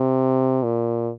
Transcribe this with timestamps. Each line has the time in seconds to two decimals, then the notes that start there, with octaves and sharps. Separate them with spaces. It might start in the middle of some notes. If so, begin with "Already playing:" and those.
Already playing: C3
0.63 A#2